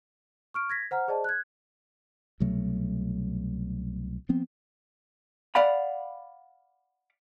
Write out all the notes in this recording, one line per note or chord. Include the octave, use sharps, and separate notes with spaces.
C#6 F6 D7
G#6 A#6 B6
C5 F#5 A#5 F6
G#4 C5 D5 D#5 A5
F#6 G#6
C2 B2 F#3 A3
F3 B3 C4
D5 F5 F#5 B5